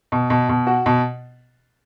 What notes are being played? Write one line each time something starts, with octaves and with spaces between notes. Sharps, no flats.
B2
B2
B2
F#4
B2